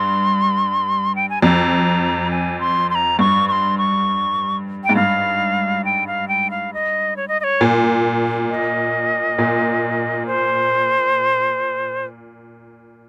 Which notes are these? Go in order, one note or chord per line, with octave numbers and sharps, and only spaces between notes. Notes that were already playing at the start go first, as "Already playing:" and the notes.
Already playing: G2 C6
G5
G#5
F2 A#5
G#5
C6
C6
A#5
G2 C#6
C#6
C6
C#6
G5
G#2
G2 F5
G5
F5
G5
F5
D#5
C#5
D#5
D#5
C#5
A#2
D#5
A#2
C5